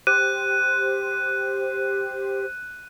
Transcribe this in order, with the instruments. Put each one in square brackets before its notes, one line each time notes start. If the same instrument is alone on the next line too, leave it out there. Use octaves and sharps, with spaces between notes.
[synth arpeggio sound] G4 C5 [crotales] F#6 D#7